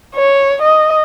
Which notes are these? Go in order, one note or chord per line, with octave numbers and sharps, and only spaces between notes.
C#5
D#5